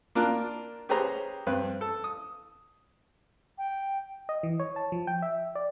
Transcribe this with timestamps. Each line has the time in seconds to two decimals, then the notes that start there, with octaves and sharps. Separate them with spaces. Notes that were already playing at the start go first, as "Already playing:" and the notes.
0.15 A#3 D4 F4 A#4 A5 F#6
0.89 C#4 G4 G#4 B4 C5 A#5
1.47 G2 C4 B4 F#6
1.81 A4
2.04 D#6
3.58 G5
4.29 D#5
4.43 E3
4.60 C#5
4.76 A5
4.92 F3
5.07 G5
5.22 E5
5.55 D5